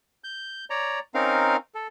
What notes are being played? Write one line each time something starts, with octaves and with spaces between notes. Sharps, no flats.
G6
C#5 D5 A#5
C4 C#4 D#4 A#4 F5
A4